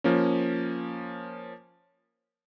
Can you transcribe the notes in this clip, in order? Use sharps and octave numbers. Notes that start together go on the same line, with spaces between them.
F3 A#3 C#4